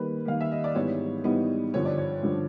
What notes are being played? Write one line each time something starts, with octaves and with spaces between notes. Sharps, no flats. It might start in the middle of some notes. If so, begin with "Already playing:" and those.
Already playing: D#3 G3 A#3 B4
D#3 G3 A#3 F5
E5
D#5
D5
G#2 E3 G3 B3 D#4 C#5
G#2 E3 G3 B3 D#4
G2 D3 F3 C#5
D5
C#5
G2 D3 F3